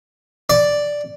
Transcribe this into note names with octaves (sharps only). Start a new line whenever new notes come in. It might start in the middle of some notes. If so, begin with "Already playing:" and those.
D5